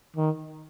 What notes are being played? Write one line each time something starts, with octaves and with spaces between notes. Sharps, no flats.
D#3